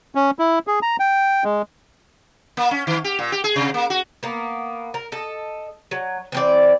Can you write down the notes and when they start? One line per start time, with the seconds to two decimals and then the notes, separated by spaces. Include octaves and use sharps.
0.15 C#4
0.39 E4
0.67 G#4
0.82 A#5
1.00 G5
1.44 G#3
2.57 A#3
2.71 C#4
2.87 D#3
3.04 G4
3.19 A#2
3.32 G4
3.44 G#4
3.56 C3
3.74 A#3
3.90 F#4
4.23 A#3 B3
4.94 A#4
5.12 A4 D#5
5.91 F#3
6.32 E3 C4 D5